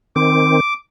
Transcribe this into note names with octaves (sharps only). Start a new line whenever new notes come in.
D#3 C4 D6